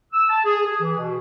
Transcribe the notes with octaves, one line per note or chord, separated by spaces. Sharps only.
E6
A5
G#4
G#4
E3
B2